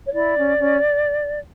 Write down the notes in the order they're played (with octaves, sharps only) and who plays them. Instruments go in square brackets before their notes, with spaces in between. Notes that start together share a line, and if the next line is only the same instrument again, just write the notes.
[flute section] C#5
E4 D5
C#4
C#4